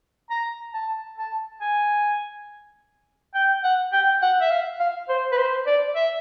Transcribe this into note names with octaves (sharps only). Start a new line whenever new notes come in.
A#5
A5
A5
G#5
G5
F#5
G5
F#5
E5
F5
F5
C5
B4
C5
D5
E5